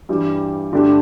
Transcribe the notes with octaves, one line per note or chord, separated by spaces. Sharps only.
G2 E3 G3
G2 D3 A3 D4 G4